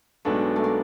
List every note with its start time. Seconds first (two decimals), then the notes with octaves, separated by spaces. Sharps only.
0.25 B1 B2 G#3 A3 B3 D4
0.56 A3
0.64 A#3